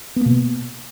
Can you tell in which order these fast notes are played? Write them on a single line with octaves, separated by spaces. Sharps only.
B3 A#3 B2